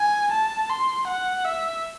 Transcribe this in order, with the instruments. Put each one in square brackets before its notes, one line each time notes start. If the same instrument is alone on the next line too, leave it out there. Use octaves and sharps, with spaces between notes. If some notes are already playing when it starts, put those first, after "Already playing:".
Already playing: [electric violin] G#5
A5
C6
F#5
E5